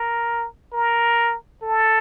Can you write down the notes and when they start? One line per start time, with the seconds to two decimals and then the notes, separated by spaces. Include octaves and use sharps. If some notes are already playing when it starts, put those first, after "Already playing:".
Already playing: A#4
0.73 A#4
1.62 A4